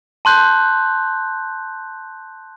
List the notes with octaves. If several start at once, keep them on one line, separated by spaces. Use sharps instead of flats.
A5 C6 F#6 G6